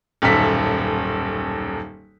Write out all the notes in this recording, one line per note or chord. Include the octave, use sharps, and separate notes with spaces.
D#1 B1 F#2 A4 B6